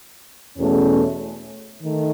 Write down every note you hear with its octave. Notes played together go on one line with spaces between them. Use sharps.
E2 B2 A3 C#4
D#3 A3